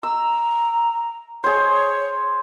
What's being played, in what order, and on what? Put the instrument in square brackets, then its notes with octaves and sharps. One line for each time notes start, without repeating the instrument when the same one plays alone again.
[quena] A#5 [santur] E6
[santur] G#4 C5 [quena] C#5